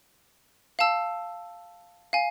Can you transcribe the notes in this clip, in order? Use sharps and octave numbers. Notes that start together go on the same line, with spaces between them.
F5 A5 E6
F5 G#5